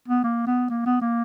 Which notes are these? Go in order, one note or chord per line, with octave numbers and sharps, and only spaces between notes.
B3
A#3
B3
A#3
B3
A#3